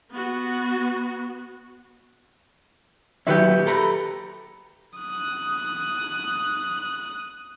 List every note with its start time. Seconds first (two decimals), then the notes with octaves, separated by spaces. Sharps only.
0.11 B3 F#4
3.27 A#2 D#3 F#3 G4 B4 E5
3.67 A4 A#5 B5
4.98 D#6 F#6